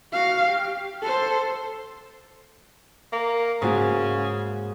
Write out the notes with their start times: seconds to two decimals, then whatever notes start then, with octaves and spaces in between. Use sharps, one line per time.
0.12 F#4 F5
0.44 G4
1.02 A4 C5
3.13 A#3
3.62 G#2 C#3 A#3 F#4